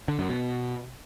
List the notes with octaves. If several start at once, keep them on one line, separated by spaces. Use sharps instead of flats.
D3
F#2
B2